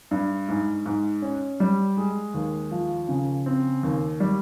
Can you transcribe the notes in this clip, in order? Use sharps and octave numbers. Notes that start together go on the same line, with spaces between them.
G2
G#2
G#2
C#4
G3
G#3
D#2
F3
C#3
C4
D#2
G3